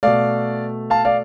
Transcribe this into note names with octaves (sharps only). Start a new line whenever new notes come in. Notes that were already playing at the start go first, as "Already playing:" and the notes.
B2 A3 D5 F5
F5 A5
D5 F5